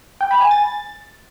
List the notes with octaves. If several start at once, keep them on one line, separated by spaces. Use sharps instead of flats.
G5
B5
G#5
A6